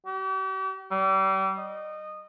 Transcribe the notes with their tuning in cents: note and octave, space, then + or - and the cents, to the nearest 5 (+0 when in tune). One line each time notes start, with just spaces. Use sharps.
G4 -45
G3 -35
D#5 -20